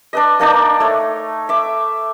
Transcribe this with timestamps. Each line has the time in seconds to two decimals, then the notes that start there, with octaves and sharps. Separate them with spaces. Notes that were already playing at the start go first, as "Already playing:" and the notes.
0.13 D4 B4 D#5
0.40 A#3 D4 D#4 D5
0.80 A3 C#5
1.49 E5 D6